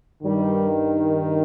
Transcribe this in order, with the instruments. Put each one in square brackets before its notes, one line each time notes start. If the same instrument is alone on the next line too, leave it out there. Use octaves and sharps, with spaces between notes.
[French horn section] G2 D#3 G3